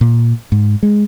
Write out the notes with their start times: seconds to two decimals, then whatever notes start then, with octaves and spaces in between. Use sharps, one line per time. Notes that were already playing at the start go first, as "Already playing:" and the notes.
0.01 A#2
0.52 G#2
0.83 G#3